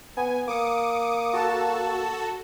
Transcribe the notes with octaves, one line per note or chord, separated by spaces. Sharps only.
B3 G#5
A#3 D6 D#6 C#7
F#4 A4 A5